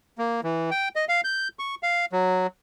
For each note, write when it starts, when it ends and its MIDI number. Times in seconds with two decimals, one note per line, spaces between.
0.18 0.41 58
0.43 0.70 52
0.71 0.89 79
0.96 1.05 75
1.09 1.21 77
1.24 1.48 91
1.59 1.75 85
1.83 2.05 77
2.12 2.47 54